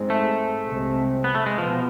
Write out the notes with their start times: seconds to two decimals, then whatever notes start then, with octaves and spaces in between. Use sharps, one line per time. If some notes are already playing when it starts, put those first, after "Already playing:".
Already playing: G#2 G#3 C4
0.10 A3
0.67 C2 C3 G#3 C4
1.24 B3
1.35 A3
1.46 G#3
1.58 B2 F3 B3